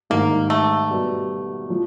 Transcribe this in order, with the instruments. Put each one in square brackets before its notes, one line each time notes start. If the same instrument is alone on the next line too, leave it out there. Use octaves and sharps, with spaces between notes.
[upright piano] G#2 D#3 G3 [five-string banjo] A#3
[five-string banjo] A3
[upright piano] B2 G3 B3
F3